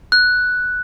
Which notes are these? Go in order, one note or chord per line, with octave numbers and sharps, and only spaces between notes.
F#6